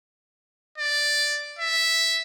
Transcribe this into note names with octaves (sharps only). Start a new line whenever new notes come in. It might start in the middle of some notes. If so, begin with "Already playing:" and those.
D5
E5